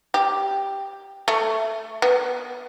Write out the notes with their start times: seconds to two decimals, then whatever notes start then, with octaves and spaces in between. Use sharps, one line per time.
0.14 G4
1.28 A3
2.02 B3